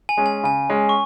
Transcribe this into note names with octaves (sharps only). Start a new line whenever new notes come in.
G#5
G#3 C#4
G#5
C#3 G#5
G#3 C#4
C#6